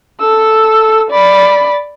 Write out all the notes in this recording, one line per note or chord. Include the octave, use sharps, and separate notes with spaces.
A4 E6
D5 B5